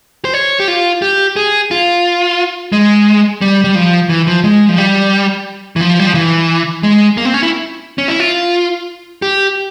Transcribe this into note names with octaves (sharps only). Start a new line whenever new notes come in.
C5
C#5
G4
F4
G4
G#4
F4
G#3
G3
G3
F3
E3
F3
G#3
F3
G3
E3
F3
G3
F3
E3
G#3
A#3
C4
C#4
E4
C#4
E4
F4
G4